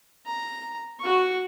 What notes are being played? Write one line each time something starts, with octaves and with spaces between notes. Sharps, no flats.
A#5
F#4 C#6